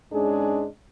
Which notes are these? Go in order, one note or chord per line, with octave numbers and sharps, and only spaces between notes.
G#2 G#3 C#4 D4 G#4